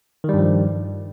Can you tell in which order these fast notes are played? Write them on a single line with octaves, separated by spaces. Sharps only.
D#3 G3 G2 F3